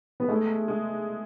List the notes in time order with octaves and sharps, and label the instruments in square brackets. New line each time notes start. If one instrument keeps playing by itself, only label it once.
[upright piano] B3
[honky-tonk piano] G#3 [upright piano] A3
[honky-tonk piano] G#3